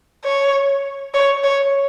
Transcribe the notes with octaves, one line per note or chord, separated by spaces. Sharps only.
C#5
C#5
C#5